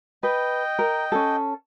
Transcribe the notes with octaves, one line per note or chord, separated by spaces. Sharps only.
B4 D#5 G5
A#4
C#4 A4